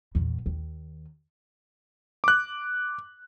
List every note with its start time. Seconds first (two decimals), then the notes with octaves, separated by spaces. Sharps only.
0.15 E2 A#2
0.46 D#2
2.24 D6 F#6